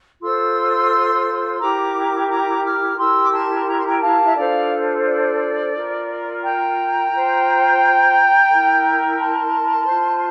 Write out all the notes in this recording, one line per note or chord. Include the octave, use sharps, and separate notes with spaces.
F4 A4 C5 C6 E6
E4 G4 A#4 A#5 D6
A#5 D6
D6 F6
E4 G4 A#4 C6 E6
D6
A5 C6
A#5
C6
G5 A#5
F5 A5
E5
D4 F4 A4 C5 D5 F5
D5
F4 A#4
G5 A#5
F4 C5
E4 A#4
A5 C6
F4 C5